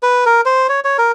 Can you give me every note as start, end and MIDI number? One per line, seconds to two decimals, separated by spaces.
0.03 0.24 71
0.26 0.41 70
0.46 0.67 72
0.69 0.80 73
0.85 0.97 73
0.98 1.12 70